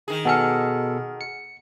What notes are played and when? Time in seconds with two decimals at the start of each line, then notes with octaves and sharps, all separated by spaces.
0.08 D#3 G#4
0.25 B2 A4 F#5 G#5 F6 C#7
1.21 C#7